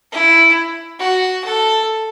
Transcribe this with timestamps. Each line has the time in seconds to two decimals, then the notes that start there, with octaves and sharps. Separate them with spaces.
0.12 E4
1.00 F#4
1.44 A4